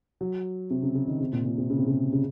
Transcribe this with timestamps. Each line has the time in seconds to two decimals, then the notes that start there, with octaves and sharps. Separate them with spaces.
0.21 F#3
0.70 C3
0.83 C#3
0.95 C#3
1.08 D#3
1.21 C3
1.33 A#2
1.45 A#2
1.58 C3
1.70 C#3
1.79 C3
1.87 C#3
2.13 C#3